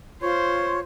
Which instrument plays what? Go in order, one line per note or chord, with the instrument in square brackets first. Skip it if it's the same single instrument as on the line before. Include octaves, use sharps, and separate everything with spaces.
[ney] F4 [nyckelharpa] C5 [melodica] C#5